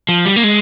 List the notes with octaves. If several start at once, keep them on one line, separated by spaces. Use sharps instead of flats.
F3
G3
A#3
G#3